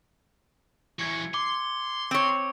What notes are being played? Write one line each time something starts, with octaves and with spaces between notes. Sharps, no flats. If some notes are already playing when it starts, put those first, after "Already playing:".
E3 F#4 G#6 C#7
C6 D6
C4 C#5